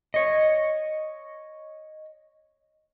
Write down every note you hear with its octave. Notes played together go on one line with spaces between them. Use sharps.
C#5 D#5